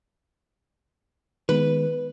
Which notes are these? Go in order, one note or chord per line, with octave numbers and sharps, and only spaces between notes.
D#3 G#3 B3 B4